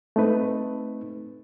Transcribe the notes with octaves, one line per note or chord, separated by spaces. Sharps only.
A3 C4 D#4 B4